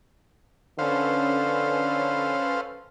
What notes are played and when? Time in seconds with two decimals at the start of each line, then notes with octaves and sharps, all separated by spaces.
0.79 D3 C#4 A4 B4 C5 F5